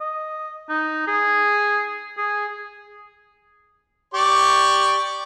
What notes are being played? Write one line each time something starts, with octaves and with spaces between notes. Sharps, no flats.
D#5
D#4
G#4
G#4
G4 D5 C#6